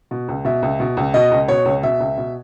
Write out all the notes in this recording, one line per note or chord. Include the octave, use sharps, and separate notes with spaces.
B2
C#2
B2 E5
C#2
B2
C#2
B2 D#5
C#2
B2 C#5
C#2
B2 E5
C#2
B2